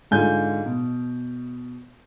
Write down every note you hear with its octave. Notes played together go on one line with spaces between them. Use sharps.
G#2 D3 F4 G#5 G6
B2